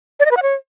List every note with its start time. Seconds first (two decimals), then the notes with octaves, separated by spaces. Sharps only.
0.20 D5
0.25 D#5
0.31 B4
0.37 F#5
0.42 C#5